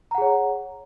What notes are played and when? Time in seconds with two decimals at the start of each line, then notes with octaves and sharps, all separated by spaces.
0.11 A#5
0.15 F#5
0.18 G#4
0.21 C#5